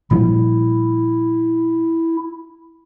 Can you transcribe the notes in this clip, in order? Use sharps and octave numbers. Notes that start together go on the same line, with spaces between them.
A#2 F3 G3 E4